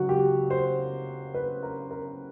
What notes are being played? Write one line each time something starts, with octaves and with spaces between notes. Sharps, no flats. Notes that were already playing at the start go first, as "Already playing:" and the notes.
Already playing: C#2 C#3 F#3 F#4
G4
C5
B4
A#4
A#4